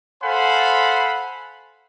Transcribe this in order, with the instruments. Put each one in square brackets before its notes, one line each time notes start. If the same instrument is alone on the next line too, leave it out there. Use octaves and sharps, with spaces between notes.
[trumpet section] A4 C5 F5 F#5 G#5 B5